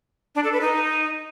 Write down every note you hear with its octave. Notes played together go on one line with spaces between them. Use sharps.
D4
A4
B4
D#4